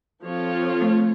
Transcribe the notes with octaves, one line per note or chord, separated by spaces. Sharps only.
F3 C4 F4 A4 C#5
A3